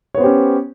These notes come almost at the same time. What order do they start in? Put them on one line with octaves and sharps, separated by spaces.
C#5 B3 C5 G4 C#4